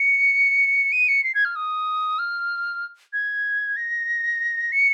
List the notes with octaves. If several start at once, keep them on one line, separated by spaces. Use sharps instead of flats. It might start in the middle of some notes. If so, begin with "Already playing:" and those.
Already playing: C#7
D#7
C#7
C7
G#6
F6
D#6
F6
G#6
A#6
C#7